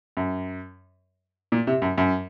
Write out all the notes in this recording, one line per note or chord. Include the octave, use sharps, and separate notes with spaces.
F#2
A#2
C3
F#2
F#2